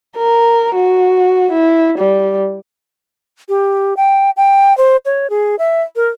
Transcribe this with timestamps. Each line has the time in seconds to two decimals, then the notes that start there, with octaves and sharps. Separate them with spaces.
0.17 A#4
0.76 F#4
1.52 E4
1.99 G3
3.49 G4
3.97 G5
4.37 G5
4.77 C5
5.06 C#5
5.30 G#4
5.59 E5
5.96 A#4